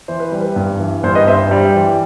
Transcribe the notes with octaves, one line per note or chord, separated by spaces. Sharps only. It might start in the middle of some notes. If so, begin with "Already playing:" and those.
E3 C5
B4
G3
B4
G2
E3
G2 C5
B4 D#5
G2 C5 E5
G3
E3